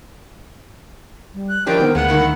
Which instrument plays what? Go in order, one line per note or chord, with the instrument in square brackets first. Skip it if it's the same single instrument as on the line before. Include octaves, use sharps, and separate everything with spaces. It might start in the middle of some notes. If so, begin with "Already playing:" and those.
[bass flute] G3
[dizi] F#6
[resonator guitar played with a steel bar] E3 F3 D4 [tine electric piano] G4 C#5 D#5 [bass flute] A#4 [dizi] G5
[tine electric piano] D#3 B3 C5 [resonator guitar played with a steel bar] G#3
[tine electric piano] D2 [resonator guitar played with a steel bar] G#3 B3 [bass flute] A#3 [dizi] F#5
[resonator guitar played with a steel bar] G2 D#3 E4